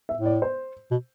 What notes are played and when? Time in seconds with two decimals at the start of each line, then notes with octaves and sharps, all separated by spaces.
0.09 E5
0.17 A2
0.26 D5
0.42 C5
0.91 B2